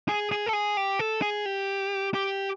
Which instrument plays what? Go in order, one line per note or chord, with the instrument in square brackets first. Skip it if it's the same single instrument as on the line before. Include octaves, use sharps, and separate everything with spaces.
[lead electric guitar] G#4
G#4
A4
G#4
G4
A4
G#4
G4
G4